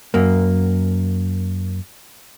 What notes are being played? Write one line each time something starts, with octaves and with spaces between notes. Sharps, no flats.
F#2 A#3